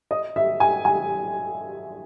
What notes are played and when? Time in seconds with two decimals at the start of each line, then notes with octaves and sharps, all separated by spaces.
0.11 D#5
0.36 E5
0.60 G#5
0.85 G#5